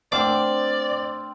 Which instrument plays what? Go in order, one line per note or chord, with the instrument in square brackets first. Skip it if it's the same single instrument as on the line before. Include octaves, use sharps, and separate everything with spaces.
[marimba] A3 D4 F#5 [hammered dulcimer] C4 F5 [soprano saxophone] D5 [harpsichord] D6